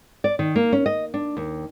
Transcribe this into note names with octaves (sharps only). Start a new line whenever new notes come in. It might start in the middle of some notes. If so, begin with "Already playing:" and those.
D5
D#3
A#3
C#4
D#5
D4
D#2